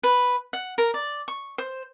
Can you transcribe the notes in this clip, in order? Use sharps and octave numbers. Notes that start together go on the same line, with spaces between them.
B4
F#5
A#4
D5
C#6
C5